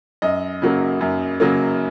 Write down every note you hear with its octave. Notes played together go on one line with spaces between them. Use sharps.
F#2 D#5
C#3 F#3 A#3
F#2
C#3 F#3 A#3